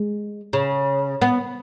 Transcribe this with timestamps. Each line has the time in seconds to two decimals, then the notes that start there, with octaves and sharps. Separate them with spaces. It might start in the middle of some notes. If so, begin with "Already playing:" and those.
Already playing: G#3
0.53 C#3
1.22 B3